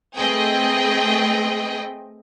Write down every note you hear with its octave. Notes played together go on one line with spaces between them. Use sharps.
A3 C4 G#4 B4 D#5 G5